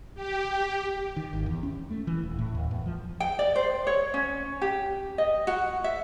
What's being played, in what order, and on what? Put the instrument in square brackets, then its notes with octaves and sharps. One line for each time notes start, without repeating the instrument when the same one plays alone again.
[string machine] G4
[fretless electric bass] D#3
G#1
E2
C#4
A3
E3
D#1
A2
D#2
E2
F3
[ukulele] G5
D5
C5
C#5
C#4
G4
D#5
F#4
E5